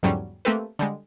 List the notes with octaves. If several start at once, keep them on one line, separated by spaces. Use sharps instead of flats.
E2 G#2 D3 F#3 G3 C#4
A3 A#3 C4 G4 A4 B4
D3 G3 G#3